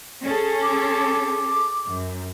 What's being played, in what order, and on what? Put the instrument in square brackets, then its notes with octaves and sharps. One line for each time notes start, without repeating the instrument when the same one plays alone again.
[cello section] C#4 G#4 A4
[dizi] D6
[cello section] F#2